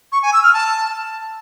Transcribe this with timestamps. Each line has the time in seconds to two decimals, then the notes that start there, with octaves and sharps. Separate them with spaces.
0.12 C#6
0.23 G#5
0.33 E6
0.43 F6
0.54 A5